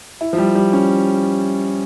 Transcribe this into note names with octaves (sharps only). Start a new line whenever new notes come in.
E4
F3
G3
G3
C#4